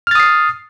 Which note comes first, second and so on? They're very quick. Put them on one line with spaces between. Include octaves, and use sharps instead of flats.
F6 A6 D#6 C7